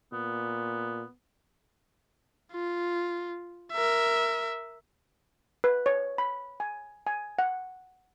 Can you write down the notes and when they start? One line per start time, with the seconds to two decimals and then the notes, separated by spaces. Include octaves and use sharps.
0.13 A#2 B3
2.52 F4
3.72 A#4 E5
5.64 B4
5.86 C#5
6.18 B5
6.60 G#5
7.07 G#5
7.39 F#5